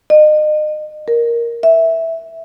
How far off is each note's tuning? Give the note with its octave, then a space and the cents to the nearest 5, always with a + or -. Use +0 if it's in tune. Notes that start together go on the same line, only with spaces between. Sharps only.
D#5 -35
A#4 +5
E5 -5